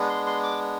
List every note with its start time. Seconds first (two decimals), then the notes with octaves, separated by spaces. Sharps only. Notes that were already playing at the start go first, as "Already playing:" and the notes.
Already playing: G#3 B3 D4
0.09 C6
0.27 C6
0.43 D6